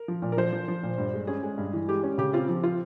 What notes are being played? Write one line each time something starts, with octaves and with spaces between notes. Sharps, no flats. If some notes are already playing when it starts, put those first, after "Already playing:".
Already playing: A#4
F3
A#2
A#4
F3 C5
F3
F3
A#2
G2
G#3
C#4 G#4
G#3
G2
E3
G#3 G4
C#4
C#3 G4
C4 F4
F3
C4 F4